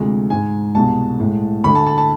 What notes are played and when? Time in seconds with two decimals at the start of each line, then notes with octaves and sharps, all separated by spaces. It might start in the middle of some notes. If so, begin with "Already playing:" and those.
Already playing: D2 C3 F3 G#3
0.30 G#2 G#3 G#5
0.75 C2 B2 G#3 A5
1.20 A2 G#3
1.64 D2 D3 A3 B5
1.75 A5
1.87 A5
1.98 A5